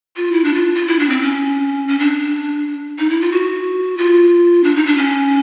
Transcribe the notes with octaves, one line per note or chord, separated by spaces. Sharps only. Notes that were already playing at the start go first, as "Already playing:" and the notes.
F4
E4
D4
F4
F4
E4
D4
C4
C#4
C#4
D4
D#4
E4
F4
F#4
F4
D4
D#4
D4
C#4